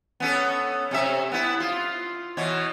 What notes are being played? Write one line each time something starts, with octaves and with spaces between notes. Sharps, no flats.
B3 C#4 A4
C3 C#4 E5
B3 E4
F4
B2 E3 C#5